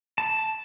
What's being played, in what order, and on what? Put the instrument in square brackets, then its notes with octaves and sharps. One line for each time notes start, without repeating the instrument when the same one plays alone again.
[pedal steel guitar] A5